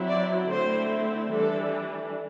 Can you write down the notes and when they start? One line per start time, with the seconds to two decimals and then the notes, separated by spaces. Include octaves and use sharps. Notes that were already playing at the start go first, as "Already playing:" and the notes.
Already playing: F#3 C4 E4
0.08 D5
0.49 D3 A3 C4 E4 C5
1.30 E3 G3 D4 A4